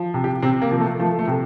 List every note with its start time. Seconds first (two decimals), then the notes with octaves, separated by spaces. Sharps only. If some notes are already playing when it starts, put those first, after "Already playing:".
Already playing: F3
0.14 C3
0.24 G4
0.42 C3 C4
0.62 A#3
0.71 F3
0.80 A3
0.99 F3 A3
1.19 A3
1.27 C3